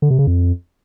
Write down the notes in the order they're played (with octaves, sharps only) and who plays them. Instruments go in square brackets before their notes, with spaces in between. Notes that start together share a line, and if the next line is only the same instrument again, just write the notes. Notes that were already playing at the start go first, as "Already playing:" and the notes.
[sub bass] D3
C3
C#3
F2